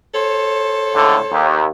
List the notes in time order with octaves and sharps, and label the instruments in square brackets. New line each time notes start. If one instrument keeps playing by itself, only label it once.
[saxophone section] A4 C5 C#5
[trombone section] C#2 A2 D3
D#2